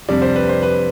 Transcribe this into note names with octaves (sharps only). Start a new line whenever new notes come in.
F2 C3 G3 D4 D5
C5
B4
C5
B4